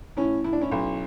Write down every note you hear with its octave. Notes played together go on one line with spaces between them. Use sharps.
A2 C#4 E4
A2 E4
D4
C#4 E4
B1